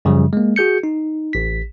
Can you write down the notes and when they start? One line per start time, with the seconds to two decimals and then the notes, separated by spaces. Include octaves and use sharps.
0.05 F#2 C#3 F3 G3
0.33 G#3 A#3
0.56 F#4 G#4 G6 C#7
0.83 D#4
1.33 A1 B6